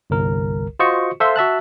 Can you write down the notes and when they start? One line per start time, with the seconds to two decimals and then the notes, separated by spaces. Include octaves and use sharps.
0.10 G1 C2 A#4
0.79 F4 F#4 C5 D#5 C#6 C#7
1.20 A4 C5 E5 F5 C6
1.36 F#4 E5 A5 F#6